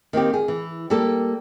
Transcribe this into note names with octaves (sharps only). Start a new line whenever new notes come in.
D#3 A#3 C4 G4
G#4
E3
G3 A#3 G4 A4